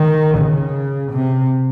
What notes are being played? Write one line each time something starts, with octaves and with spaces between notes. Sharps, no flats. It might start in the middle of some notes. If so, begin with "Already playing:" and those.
Already playing: D#3
C#3
C3